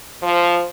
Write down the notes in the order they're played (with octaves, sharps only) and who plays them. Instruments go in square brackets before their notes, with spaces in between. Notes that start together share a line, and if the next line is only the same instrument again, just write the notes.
[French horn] F3